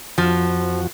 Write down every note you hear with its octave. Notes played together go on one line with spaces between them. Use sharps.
F2 F3 F#4